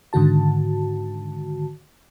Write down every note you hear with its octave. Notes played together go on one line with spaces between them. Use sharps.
G#2 D3 D#3 F#4 A5